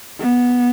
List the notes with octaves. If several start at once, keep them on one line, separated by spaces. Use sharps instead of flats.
B3